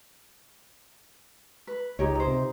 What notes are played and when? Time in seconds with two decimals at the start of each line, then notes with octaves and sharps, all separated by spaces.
1.67 B4
1.99 C#2 D#4 G4 C#5
2.15 D#4 C5
2.27 C3